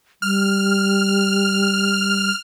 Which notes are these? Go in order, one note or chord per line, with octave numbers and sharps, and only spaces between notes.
G3 F6